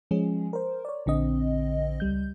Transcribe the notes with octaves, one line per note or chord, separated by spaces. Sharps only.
F3 G#3 C#4 G#4
A#4 C5
C#5 D5
A#1 D3 C4 D#5
C#2 G3 G6